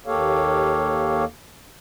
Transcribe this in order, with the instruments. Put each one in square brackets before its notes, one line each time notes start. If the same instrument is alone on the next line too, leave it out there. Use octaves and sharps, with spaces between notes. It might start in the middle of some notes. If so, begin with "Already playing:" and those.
[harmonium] D#2 A#3 G4 A4 C#5 F5